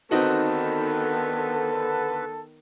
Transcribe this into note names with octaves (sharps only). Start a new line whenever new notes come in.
D3 D#3 B3 C4 D#4 F#4 A4 B4